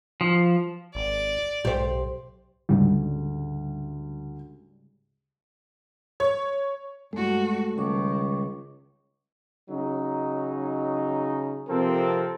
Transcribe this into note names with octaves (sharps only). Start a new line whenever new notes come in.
F3
G#1 D5
B1 G#2 G4 C5
D2 G#2 C#3 G3
C#5
G2 G#3 A3 F#4
C#2 D#3 G3 C#6 D6
C#3 F#3 D#4
C3 F3 C4 A4 A#4